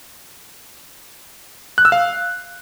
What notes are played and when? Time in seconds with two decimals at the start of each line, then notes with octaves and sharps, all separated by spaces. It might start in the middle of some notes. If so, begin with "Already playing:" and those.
1.78 F#6
1.85 E6
1.92 F5